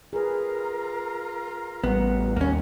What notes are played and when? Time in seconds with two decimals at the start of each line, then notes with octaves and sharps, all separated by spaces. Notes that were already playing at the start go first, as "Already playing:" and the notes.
0.13 F4 G#4 A#4 B4 A#5
1.84 A1 G3 B3 F#5
2.36 D#2 A#3 C#4